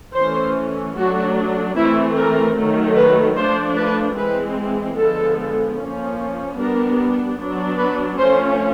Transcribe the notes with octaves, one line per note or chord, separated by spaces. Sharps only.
E3 A3 C#4 C5
F#3 A3 D4 F#4
E3 A3 C4 E4
A#4
D#3 F#3 A3
B4
F3 A3 D4 C5
B4
E3 G#3 C4 B4
D3 F3 G#3 B3 A4
F3 A#3 C#4
G3 B3 D4 A#4
F#3 B3 D4
B4
F3 A3 C#4 C5